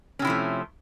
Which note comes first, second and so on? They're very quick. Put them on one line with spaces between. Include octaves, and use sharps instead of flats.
C#4 C3 E4 F3 A3